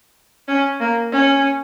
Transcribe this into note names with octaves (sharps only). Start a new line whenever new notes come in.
C#4
A#3
C#4